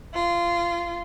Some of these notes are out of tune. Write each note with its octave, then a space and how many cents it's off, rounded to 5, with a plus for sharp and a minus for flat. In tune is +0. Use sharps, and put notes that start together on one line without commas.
F4 -20